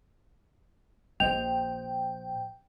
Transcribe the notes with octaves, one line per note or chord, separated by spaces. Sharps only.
A#1 C5 D#5 G5 F7